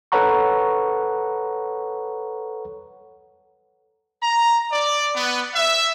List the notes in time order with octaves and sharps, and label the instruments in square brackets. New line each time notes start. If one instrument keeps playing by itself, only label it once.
[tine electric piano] A4 B4 C#5 F#5 A#5 C#6
[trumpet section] A#5
D5
B3
E5